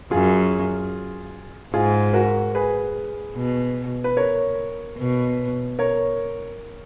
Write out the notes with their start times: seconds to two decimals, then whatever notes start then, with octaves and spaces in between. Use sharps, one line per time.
0.11 F#2 F4 G#4
1.74 G#2 F4 G#4
2.13 F#4 A#4
2.55 G#4 B4
3.35 B2
4.04 B4
4.17 A#4 C#5
4.98 B2
5.79 A#4 C#5